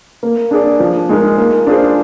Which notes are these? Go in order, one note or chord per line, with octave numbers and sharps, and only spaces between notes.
A#3
D4 G#4 D5
F3
G#3 D#4 A#4
A#3
D4 F4 G#4 C5